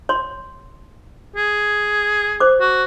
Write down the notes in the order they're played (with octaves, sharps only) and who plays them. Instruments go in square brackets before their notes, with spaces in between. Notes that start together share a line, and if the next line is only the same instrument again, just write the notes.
[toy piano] C#5 C6
[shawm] G#4
[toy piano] C5 D6
[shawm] F#4